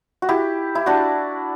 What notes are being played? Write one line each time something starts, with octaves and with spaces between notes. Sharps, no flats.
F#4
E4 G4
E4
D4 F#4